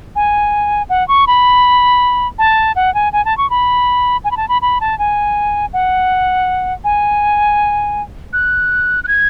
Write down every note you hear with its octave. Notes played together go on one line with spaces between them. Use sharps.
G#5
F#5
C#6
B5
A5
F#5
G#5
G#5
A5
C#6
B5
G#5
B5
A5
B5
B5
A5
G#5
F#5
G#5
F#6
F#6
G#6